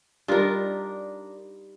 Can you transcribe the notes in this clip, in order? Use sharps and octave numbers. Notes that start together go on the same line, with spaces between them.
G3 D4 D#4 F4 A#4